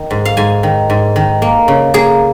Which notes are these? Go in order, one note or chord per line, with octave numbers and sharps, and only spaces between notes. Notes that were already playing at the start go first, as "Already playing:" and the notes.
Already playing: D#3
G#2
F5
G#2 G#5
D#3
G#2
D#3
A#3
C#3
A#3 G#4